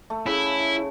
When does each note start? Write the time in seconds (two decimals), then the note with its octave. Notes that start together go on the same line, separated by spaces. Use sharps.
0.10 A3
0.26 C#3 E4